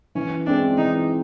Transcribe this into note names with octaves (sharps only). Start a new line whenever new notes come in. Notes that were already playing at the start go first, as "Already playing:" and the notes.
E3 C#4
G#3 C4 D4 E4
E3 D#4